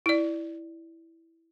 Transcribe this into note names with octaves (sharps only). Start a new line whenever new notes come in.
E4 D5